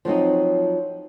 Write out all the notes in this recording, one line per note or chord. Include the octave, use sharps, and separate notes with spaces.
F3 F#3 C4 D#4